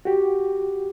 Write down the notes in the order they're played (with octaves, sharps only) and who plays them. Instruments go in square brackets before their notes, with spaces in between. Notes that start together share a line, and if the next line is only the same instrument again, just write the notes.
[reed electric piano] F#4 G4